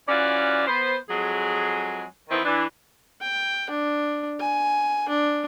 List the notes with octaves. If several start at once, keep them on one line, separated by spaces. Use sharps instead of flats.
E3 C#4 F4 F#4 D5
B3 C5
F2 F#3 G#3 G#4
D#3 E3 B3 C4 D#4 E4
E3 D4
G5
D4
G#5
D4